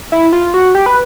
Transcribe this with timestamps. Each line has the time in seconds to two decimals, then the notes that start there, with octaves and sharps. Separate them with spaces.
0.12 E4
0.33 F4
0.54 F#4
0.75 G4
0.86 B4